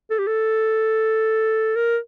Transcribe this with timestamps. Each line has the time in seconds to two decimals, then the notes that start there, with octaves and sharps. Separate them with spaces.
0.10 A4
0.19 G4
0.27 A4
1.76 A#4